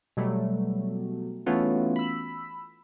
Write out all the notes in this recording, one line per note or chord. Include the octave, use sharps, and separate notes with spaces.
B2 F#3 G3 A3
E3 A3 B3 C#4 F4 F#4
B5 E6